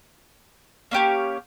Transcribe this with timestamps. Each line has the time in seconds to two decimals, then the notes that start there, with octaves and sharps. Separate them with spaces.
0.91 A#3 C#4 G4 C#5